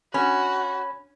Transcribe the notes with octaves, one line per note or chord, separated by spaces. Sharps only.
C#4 F#4 B5